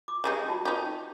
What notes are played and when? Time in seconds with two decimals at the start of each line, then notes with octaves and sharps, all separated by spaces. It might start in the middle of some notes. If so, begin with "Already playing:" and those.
0.08 D6
0.24 G3 G#3 D#4
0.48 F4 F#4 A5
0.65 D#4 G4